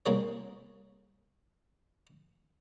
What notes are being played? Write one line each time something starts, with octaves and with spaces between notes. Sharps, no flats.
C2 A#3 G#4 C#5